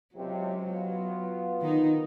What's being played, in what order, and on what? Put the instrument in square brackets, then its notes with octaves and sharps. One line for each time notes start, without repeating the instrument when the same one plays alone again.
[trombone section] C#2 C3 [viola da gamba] F#3
[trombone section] B3 F4
[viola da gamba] D#3 D#4